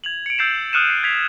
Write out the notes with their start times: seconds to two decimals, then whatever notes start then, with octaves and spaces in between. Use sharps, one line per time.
0.04 G#6 F7 F#7
0.26 C#7 D7
0.38 E6 G6 A6 C7 C#7 E7
0.73 D#6 F6 F#6 C#7 D#7 E7
0.90 C7
1.04 G#6 B6 C7 F7